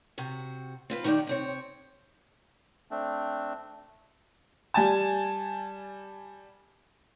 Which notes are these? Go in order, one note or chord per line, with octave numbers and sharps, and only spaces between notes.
C3 F#4
C4 F4 B4
D#3 D#4 F#4 G4 D5
C3 C4 C#5
A3 C4 D4
G3 G#5 A5